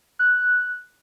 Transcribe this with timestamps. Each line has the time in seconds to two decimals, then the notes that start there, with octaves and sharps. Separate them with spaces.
0.19 F#6